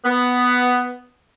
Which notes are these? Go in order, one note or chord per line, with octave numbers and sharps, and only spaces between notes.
B3